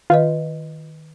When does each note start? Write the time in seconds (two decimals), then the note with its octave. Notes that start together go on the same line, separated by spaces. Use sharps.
0.10 D#3 F4 B4 D#5